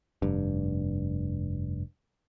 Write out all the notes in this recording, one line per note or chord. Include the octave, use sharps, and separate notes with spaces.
F1 G2